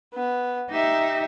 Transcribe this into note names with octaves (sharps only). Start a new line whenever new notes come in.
B3
D#4 G4 E5